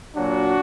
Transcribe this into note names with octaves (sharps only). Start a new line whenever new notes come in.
A#2 F#3 D4 F#4